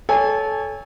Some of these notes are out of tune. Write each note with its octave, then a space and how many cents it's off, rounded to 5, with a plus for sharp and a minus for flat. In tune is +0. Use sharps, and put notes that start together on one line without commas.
A4 -20 C#5 +20 G#5 -35